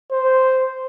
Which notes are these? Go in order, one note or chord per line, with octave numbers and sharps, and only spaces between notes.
C5